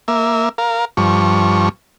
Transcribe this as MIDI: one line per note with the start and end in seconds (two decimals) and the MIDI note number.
0.08 0.49 58
0.08 0.49 76
0.58 0.85 70
0.58 0.85 77
0.97 1.69 43
0.97 1.69 53
0.97 1.69 85